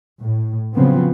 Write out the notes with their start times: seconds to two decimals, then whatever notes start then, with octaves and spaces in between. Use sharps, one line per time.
0.21 A2
0.74 C#3 F3 F#3 B3 C4